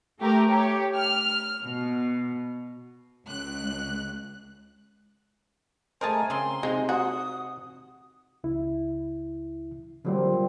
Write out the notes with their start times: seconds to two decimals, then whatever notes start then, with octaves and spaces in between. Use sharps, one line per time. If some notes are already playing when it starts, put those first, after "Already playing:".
0.20 A3 G4 A#4
0.51 G4 C#5
0.96 F6
1.62 B2
3.27 C#2 F#6
6.01 A3 G#4 A#4 C5 D#5 G#5 A5
6.30 C#3 A#3 C4 G#4 C6
6.63 C3 G#3 D#4
6.89 F#4 D#6
8.44 C#2 E4
10.05 A#2 D3 F#3 G3 C4 F4